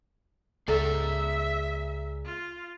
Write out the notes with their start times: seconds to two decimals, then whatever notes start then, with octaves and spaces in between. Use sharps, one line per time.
0.68 C#2 G#4 A4 D5 E5 A#5
2.25 F4